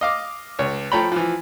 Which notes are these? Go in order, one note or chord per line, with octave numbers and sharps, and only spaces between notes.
D#5 F5 D6
C#2 C#5
F3 A3 C#5 G5 A#5 B5
E3 F3